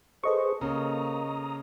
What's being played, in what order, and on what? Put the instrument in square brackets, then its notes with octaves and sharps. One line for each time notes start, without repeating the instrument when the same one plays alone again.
[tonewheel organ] G#4 B4 [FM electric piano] A4 D#5 C#6 [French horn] C5
[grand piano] C#3 [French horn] A#3 [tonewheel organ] A#5 D#6